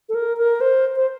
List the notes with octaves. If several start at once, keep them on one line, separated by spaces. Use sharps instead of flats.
A4
A#4
A#4
C5
C5